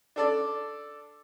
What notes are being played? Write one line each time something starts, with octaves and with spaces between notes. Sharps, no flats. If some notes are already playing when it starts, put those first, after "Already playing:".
D4 A4 D5